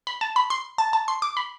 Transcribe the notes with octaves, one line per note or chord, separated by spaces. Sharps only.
B5
A5
B5
C6
A5
A5
C6
D6
B5